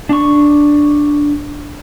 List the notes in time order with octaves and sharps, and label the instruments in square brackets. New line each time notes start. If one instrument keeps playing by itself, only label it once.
[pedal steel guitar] D4 C#6